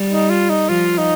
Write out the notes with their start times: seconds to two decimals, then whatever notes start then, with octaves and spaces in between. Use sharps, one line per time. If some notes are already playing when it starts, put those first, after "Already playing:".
Already playing: G3
0.11 D#4
0.30 F4
0.50 D#4
0.69 F3 F4
0.98 D#4